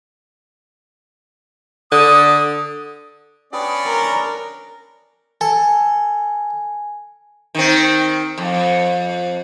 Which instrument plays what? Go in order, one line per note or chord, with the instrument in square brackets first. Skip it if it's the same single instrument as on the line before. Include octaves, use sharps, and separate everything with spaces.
[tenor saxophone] D3 [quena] D#6
[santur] B3 G5 D#6 [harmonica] C#4 D4 D5
[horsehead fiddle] A#4 [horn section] A#5
[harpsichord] A4 [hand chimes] G#5
[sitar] D#3 C4
F2